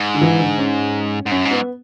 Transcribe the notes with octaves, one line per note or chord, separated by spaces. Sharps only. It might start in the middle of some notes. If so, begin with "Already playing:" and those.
Already playing: G#2
D3
E3
D3
C#4
G#2
F#2 C#4
G#2
B3